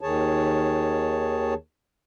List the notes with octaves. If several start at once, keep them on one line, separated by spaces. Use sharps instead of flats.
D#2 D#3 G#4 C#5 A5